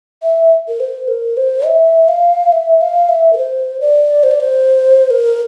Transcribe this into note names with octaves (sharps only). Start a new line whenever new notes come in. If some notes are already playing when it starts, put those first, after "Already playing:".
E5
A#4
C5
A#4
C5
E5
F5
E5
F5
E5
A#4
C5
D5
C5
D5
C5
A#4